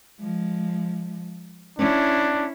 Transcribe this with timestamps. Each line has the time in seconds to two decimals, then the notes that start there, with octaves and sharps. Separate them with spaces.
0.20 F3 G#3
1.79 C#4 D4 E4